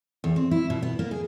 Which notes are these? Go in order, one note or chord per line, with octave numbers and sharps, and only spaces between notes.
E2
C4
E4
B2
B3
A#3
G#4